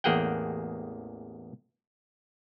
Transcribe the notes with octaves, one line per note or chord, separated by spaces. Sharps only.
A1 E2 A#3 G#4 F#5 G5